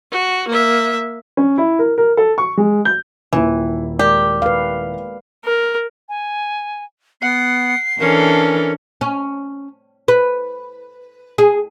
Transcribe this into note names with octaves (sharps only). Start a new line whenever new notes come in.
F#4
A#3 E5
C#4
E4
A#4
A#4
A4
C#6
G#3
G6
D#1 D#2 E3 E4
G#3 G4 A#4 D5
B4 F5
A#4
G#5
B3 F#5 C7
E3 C#4 D4 A4 A#4
C#4
B4
G#4